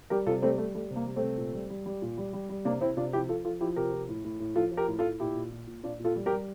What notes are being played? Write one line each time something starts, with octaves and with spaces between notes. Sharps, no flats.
G3 G4 A#4
C3 F4 A4
G3 A3 C4
G3 A3
G3 A3
C3
A#3
G3
A3 C4
C3
A#2
G3
G3
G3
A#2
G3
G3
G3
C3 A#3 D4
C3 C4 E4
C3 D4 F4
F3 E4 G4
F3 F4 A4
F3 F4 A4
F3 E4 G4
C3 G4 A#4
F3
A2
A2
A2
F3 F4 A4
F3
G4 A#4
A2
F4 A4
A2
A#2 E4 G4
A#2
A#2
A#2
A#2 D4 F4
A#2
F4 A4
G3
G4 A#4
G3